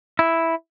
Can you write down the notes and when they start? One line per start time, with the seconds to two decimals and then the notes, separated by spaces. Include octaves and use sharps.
0.19 E4